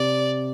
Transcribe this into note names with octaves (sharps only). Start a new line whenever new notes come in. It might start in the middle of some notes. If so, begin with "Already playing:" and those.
Already playing: C3 D5